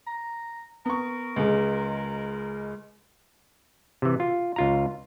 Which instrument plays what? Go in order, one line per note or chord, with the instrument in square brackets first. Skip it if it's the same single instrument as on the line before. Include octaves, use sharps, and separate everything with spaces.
[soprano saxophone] A#5
[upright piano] B3 C#6 [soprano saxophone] A#4
[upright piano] C#2 G#3
[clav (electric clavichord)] C3 E3
F4
C#2 F4 A#5